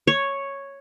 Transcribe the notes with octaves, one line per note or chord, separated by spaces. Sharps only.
C#5